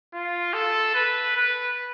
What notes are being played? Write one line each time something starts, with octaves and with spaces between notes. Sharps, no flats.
F4
A4
B4
B4